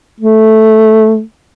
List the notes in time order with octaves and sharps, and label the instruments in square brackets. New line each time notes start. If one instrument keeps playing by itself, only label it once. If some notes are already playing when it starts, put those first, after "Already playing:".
[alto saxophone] A3